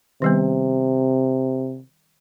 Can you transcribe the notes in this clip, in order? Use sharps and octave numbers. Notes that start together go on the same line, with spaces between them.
C3 D#3 G3 B3